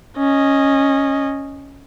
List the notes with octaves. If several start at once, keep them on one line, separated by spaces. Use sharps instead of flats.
C#4 D#5